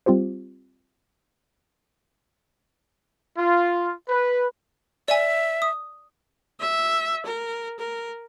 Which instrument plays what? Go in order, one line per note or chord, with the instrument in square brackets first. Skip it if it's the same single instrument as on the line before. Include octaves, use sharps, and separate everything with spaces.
[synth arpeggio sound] G3 C4 F4 G4 C5
[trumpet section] F4
B4
[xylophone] D5 G#5 [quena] E5
[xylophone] D#6
[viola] E5
A#4
A#4